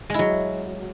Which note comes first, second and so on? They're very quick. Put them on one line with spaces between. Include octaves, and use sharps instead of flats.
G#3 E4 F#3